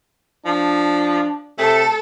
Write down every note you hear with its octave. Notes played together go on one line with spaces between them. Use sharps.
F3 D4
C3 A3 A4